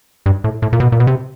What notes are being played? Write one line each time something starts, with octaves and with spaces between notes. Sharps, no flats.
G2
A2
A2
A#2
B2
A#2
B2
C3